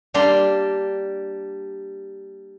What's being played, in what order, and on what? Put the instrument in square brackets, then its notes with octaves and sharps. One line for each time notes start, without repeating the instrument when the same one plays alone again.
[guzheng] G3 A#3 D4 C6